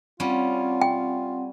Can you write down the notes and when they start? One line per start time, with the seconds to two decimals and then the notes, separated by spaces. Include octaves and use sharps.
0.20 G3 C4 C#4 F4 F#5
0.81 G5